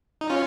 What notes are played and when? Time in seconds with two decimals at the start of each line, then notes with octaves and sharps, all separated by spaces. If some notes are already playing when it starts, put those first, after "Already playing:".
0.21 D#4
0.30 C#4 F4